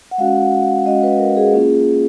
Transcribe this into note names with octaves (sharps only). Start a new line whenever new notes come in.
F#5
G#3 C#4 F#4 F5
F#5
F5
G#3 C#4 F#4 D#5
B4
A#4
G#4
A#3 C#4 F4